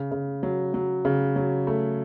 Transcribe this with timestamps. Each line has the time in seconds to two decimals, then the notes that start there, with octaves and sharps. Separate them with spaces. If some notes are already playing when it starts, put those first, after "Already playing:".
Already playing: C#3
0.11 C#3
0.43 F#3
0.74 F#3
1.05 C#3
1.36 F#3
1.67 A3